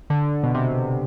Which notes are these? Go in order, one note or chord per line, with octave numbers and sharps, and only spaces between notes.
D3
B2
C3